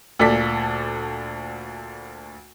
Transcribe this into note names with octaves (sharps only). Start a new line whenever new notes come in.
D2 A#2 A4 D5 B6